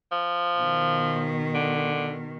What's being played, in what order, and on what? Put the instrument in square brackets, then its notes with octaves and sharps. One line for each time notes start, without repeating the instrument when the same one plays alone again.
[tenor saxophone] F3
[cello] B2 D#3
[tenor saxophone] D3